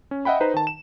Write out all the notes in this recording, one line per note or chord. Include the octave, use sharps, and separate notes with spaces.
C#4
D#5 E5 F#5 G5 B5
D#4 B4 C5 A#5
D#3 A5
E7